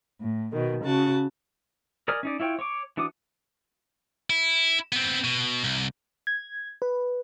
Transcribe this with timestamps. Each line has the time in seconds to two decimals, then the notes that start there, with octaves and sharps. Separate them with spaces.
0.21 A2
0.52 B2 D#3
0.83 C#3 F#4 A5
2.08 A#4 D5 D#5 G#5 F6
2.23 C#4 D#4 D5
2.40 E4 F4 C#5 G5
2.59 C#5 C#6 D6
2.97 E3 D4 F#4 D6 D#6
4.30 E4
4.92 B3 C4
5.24 B2
5.64 C2
6.27 G#6
6.82 B4